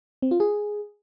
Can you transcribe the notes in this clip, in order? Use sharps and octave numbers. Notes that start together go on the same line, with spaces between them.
C4
F4
G#4